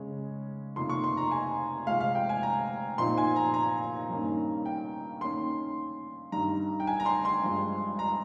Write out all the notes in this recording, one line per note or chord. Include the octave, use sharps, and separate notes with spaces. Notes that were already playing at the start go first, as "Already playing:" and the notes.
Already playing: C#3 G#3 C#4
F2 C3 D#3 A#3 C6
C#6
C6
A#5
G#5
C3 F3 G#3 F5
F5
G5
G#5
A#5
A#2 F3 C4 D#4 C6
G#5
A#5
A#5
G2 D#3 A#3 C#4
G5
D#3 A#3 C#4 C6
G2 D#3 G3 A#5
G5
G#5
A#5
C6
C6
G2 F3 G#3
A#5